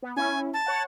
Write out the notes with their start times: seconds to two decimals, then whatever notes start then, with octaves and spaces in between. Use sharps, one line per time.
0.02 B3
0.16 C#4 E4 G#5
0.54 A5
0.66 C#5 F#5